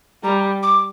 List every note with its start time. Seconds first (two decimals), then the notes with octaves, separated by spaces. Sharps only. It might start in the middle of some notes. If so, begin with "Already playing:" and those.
0.23 G3 A#5
0.63 D6